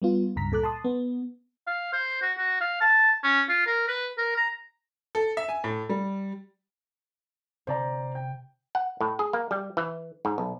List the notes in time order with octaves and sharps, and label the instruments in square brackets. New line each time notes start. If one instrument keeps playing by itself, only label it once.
[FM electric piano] G3 B3 F4
C#2 G2 A#5 B6
A#2 A4 D6 F#6
A5 C6 D#6
B3
[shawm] F5
C5
F#4
F#4
F5
A5
C#4
F4
A#4
B4
A#4
A#5
[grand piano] A4
E5
G#5
A2
G3
[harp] C3 [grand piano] C5 D5 A#5
[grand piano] G5
[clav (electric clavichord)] F#5
A2
G#4
A#3
G3
E3
G#2
B1